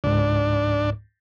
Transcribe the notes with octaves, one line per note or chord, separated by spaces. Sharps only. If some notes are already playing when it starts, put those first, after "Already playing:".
C#2 G#2 D4